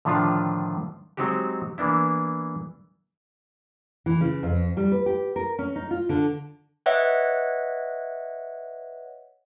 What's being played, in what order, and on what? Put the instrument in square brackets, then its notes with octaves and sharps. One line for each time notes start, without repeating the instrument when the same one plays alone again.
[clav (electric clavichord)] A2 D3 D#3 F3 D4 F4
F#3 G#3 C4 D#4 F#4 G4
E3 A#3 B3 D4 E4
[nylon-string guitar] E3
C#3
F2
G3
B4
G4
A#4
C#4
D#4
F4
D3
[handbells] B4 C#5 D#5 E5 F#5